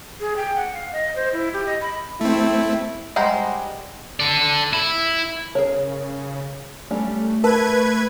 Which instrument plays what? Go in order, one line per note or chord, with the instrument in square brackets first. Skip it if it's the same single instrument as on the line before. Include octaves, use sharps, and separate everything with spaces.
[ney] G#4
G5
F#5
F5
D#5
C5
E4
G4
D#5
B5
[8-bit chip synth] A3 C4 [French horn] E4
[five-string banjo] G3 G#3 C5 F#5 A#5
[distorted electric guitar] A4 D5
E4
[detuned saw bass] C#3 [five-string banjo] G#4 A#4 C#5
[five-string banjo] G3 C#4 D4 [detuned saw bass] A3
[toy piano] A#4 [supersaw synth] B4 G#6 [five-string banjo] A5